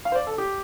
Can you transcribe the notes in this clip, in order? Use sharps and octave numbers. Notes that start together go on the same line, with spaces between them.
F5
C5
D5
A4
G4